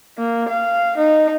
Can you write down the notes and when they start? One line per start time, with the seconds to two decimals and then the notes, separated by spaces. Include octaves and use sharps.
0.18 A#3
0.49 F5
0.98 D#4